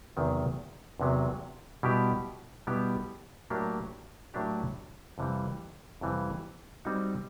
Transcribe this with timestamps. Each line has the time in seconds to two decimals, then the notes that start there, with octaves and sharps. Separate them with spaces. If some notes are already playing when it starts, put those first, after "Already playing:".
0.17 E2 C3 D#3 F#3
1.00 E2 C3 D#3 F#3
1.83 B2 G3 B3 E4 G4
2.67 B2 G3 B3 E4 G4
3.50 A2 F#3 A#3 D4 G4
4.34 A2 F#3 A#3 D4 G4
5.18 F2 C3 E3 G3
6.01 F2 C3 E3 G3
6.85 G3 C4 D#4 F#4